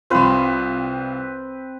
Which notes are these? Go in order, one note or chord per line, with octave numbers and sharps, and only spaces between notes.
C2 C4 F4 B4